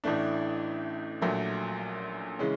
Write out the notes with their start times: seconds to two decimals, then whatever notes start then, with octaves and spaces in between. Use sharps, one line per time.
0.04 A1 A2 E3 A3 D4
1.22 A#1 A#2 F#3 A3
2.39 C#3 E3 G#3 C#4